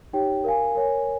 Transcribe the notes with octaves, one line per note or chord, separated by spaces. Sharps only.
D#4 G4 C#5 G5
A#4 F5 G#5
A#4 C#5 G#5